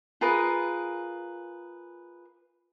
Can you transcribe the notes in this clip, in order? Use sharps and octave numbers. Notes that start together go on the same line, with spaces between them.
F4 G#4 A#4 B4